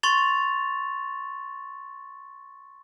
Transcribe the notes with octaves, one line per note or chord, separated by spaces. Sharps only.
C6 C#6 A6 F7